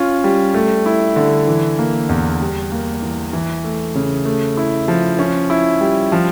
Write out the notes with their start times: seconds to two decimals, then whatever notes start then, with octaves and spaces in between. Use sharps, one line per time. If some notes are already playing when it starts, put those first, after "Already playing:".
Already playing: C#4 F4
0.24 G3
0.54 A3
0.86 E4
1.16 D3
1.47 E3
1.79 A#3
2.09 E2
2.40 G3
2.72 A#3
3.02 E3
3.33 E3
3.64 A3
3.95 C#3
4.25 A3
4.57 E4
4.88 F3
5.19 C#4
5.50 E4
5.81 G3
6.12 F3